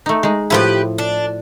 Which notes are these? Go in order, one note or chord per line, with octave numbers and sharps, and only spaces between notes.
A3 D#4
G#3 D#4
A2 F3 E4 G4 A#4 B4
D4